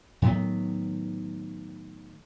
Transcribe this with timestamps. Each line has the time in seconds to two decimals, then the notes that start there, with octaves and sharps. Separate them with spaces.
0.22 A2 D#3 F#3 B3